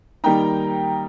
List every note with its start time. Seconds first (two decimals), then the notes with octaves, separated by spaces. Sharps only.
0.24 D#3 G3 A#3 D#4 G5 A#5